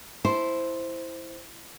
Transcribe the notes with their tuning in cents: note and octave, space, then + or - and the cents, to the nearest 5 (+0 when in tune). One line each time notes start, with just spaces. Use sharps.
E4 +0 C5 +0 A5 +0